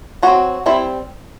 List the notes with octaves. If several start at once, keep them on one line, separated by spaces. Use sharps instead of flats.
F#3 C4 F#4
G3 C4 E4